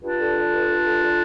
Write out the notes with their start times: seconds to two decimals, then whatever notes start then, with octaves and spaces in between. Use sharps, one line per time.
0.02 G2 D4 F4
0.18 D3
0.35 D3
0.52 G2
0.68 G2
0.84 D3
1.02 D3